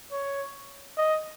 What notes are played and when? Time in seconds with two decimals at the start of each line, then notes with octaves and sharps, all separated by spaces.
0.11 C#5
0.98 D#5